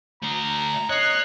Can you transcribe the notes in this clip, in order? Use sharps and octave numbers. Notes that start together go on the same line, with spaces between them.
A3 D5 A#5
C#5 D#5 F#6 C7